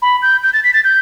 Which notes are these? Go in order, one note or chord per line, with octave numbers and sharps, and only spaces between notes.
B5
G6
G6
A6
B6
A6
G6